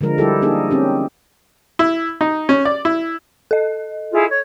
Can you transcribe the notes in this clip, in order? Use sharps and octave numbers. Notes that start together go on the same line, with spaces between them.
D3 F3 G#3 A#4
G3 E4 G4 A4
A#3 D4 D#4 G#4 A#4
C4 C#4 G4
E4
D#4
C#4
D5
E4
A4 D#5
E4 F4 G#4
C#5